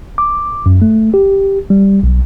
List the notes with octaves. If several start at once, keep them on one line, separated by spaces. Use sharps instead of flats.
D6
F#2
A3
G4
G3
B1